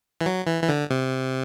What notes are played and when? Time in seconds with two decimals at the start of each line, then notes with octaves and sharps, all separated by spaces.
0.21 E3
0.26 F#3
0.47 E3
0.63 E3
0.69 D3
0.90 C3